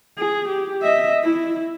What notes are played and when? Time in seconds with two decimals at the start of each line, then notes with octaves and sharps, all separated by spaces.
0.18 G#4
0.49 G4
0.82 D#5 E5
1.23 E4